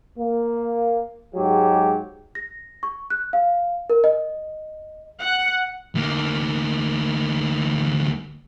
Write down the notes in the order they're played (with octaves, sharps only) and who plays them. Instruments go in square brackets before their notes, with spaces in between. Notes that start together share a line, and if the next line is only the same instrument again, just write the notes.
[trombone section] A#3
G#2 F#3 G#3 G4
[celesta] A#6
C#6
F#6
F5
A#4
D#5
[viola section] F#5
[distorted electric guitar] D2 A#3